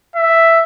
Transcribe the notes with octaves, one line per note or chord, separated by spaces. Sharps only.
E5